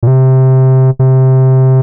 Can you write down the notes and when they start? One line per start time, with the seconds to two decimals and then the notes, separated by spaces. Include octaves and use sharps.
0.03 A#2
0.07 C3
0.99 C3